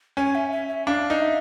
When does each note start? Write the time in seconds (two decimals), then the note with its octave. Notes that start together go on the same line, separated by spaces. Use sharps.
0.17 C#4 G#5
0.35 E5
0.52 E5
0.69 E5
0.86 D4 F5
1.10 D#4
1.21 E5